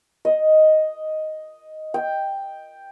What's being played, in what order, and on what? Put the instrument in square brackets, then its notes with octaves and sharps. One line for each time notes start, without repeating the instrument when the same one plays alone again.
[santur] D#5
G5